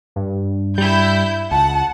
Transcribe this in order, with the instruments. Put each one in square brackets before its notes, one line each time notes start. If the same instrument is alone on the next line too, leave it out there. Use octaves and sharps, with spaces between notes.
[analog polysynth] G2
[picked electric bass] G3 [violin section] E4 G6
[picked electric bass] C#2 [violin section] F#5 [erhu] A5